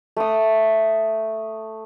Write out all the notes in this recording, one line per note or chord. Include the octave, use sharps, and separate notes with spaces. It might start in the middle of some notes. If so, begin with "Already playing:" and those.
A3 D#6